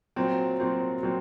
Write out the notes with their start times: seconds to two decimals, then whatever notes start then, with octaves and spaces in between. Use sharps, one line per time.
0.16 A#2 F#3 C4
0.60 A#2 F#3 C4
1.03 A#2 F#3 C4